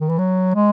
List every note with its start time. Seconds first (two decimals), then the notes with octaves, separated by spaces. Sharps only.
0.01 D#3
0.09 E3
0.18 F#3
0.55 G#3